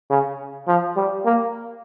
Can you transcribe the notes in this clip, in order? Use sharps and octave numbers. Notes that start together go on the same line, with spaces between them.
C#3
F3
G3
A#3